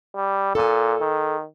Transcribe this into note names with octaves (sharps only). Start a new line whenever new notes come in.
G3
A#2 A4 G#5
D#3